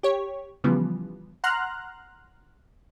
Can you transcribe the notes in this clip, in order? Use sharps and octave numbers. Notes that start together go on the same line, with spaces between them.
G4 C#5
C#3 E3 F3 G3 B3
F#5 A#5 C6 F6 F#6